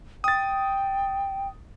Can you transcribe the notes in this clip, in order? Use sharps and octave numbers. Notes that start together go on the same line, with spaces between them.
G5 D#6 A6